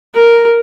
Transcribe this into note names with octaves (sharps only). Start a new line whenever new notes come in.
A#4